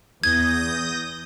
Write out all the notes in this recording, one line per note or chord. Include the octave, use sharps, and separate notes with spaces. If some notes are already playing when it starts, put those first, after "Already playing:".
E2 D#6 G6 G#6 A#6